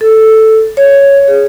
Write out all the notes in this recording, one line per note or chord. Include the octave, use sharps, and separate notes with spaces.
A4
C#5
G#4